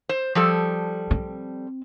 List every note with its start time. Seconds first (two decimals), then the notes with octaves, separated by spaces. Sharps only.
0.09 C5
0.35 F3 G3 A4
1.11 C4